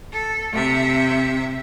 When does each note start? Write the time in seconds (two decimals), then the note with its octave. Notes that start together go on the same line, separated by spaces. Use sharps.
0.12 A4
0.53 C3 E5